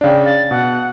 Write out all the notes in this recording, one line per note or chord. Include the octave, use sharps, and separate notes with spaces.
C#3 D4 D5 F5 G5
F5 A6
B2 F#5